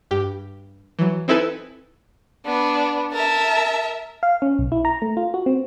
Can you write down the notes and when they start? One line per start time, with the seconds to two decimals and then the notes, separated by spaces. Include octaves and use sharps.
0.11 G2 G4
0.99 E3 F#3
1.28 C4 D#4 E4 A4 B4 G#5
2.45 B3 D4
3.13 A#4 E5 A5
4.23 F5
4.42 C#4
4.58 B1
4.72 E4
4.85 A#5
5.02 A3
5.17 F4
5.34 F#4
5.46 C4